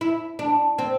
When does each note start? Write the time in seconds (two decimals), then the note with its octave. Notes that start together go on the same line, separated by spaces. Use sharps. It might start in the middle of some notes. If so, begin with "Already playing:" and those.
0.01 E4
0.39 D4
0.78 C4